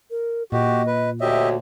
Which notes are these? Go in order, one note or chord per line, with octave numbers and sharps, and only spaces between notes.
A#4
A#2 F#4 G4 D#5
B4
D2 F#4 G4 C#5 D#5 E5